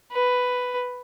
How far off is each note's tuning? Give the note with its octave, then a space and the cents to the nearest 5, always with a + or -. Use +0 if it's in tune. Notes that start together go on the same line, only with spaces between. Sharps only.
B4 +5